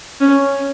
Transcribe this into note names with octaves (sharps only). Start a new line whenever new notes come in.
C#4